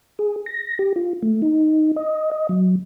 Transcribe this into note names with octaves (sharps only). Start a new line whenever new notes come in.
G#4
A#6
G4
F4
A3
D#4
D#5
D#5
F#3